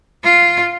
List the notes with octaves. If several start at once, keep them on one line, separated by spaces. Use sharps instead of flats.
F4